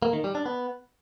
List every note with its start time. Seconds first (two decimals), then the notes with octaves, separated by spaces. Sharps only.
0.02 A#3
0.13 D#3
0.24 G3
0.35 D4
0.46 B3